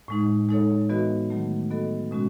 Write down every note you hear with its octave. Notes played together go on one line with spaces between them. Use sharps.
A2 G#3 D#4
G#3 D#4 A4 C#5
E3 B3 F#4 B4 D#5
D#3 F#3 A3
B3 F#4 A4 D#5
B2 G#3 C#4 F#4